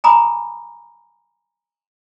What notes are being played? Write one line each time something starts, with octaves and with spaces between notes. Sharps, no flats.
G#5 A#5 B5 D6 D#6